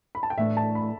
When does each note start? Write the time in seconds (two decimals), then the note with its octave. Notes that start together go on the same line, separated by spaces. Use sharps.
0.15 B5
0.23 A5
0.30 G5
0.37 A2 E3 A3 D4 E5
0.57 A5
0.75 B5